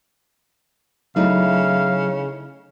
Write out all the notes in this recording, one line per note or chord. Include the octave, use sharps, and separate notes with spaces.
C#3 F#3 A3 D#4 E4 F5